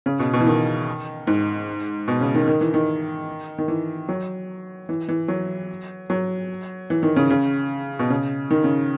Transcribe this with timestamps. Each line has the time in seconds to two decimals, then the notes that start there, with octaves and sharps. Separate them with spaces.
0.06 C#3
0.19 B2
0.33 B2
0.40 E3
0.46 D#3
1.27 G#2
2.08 B2
2.21 C#3
2.35 D#3
2.48 D#3
2.61 E3
2.74 D#3
3.58 D#3
3.68 E3
4.09 F#3
4.89 E3
5.08 E3
5.28 F#3
6.10 F#3
6.90 E3
7.03 D#3
7.16 C#3
7.30 C#3
7.99 B2
8.10 C#3
8.51 D#3
8.64 C#3